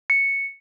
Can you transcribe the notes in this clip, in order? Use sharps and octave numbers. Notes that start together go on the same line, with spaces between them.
C#7